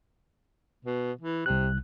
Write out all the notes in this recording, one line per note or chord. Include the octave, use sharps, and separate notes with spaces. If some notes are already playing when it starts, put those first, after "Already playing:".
B2
E3
C2 C3 F#6